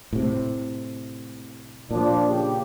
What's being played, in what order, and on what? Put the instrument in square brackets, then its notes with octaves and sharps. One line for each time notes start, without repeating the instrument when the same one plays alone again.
[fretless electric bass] A2 C3
[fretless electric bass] A#2 [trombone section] F3 D4
[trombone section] C#3 G4